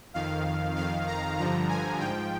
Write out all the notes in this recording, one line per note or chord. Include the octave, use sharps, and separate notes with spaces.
F2 D#3 F5
F2 D#3 F5
A#5
G2 D3 F3 A#5
G#5
G#2 F3 G5